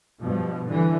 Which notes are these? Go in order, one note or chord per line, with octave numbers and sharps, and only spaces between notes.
G2 B2 F3
D3 E3